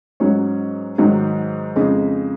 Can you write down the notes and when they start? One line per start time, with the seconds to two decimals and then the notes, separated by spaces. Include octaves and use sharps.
0.20 G#2 F#3 C#4
0.98 G#2 D#3 F#3
1.76 F2 C#3 G#3 D#4